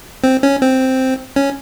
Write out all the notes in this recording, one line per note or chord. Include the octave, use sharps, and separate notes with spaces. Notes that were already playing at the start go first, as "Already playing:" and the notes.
C4
C#4
C4
C#4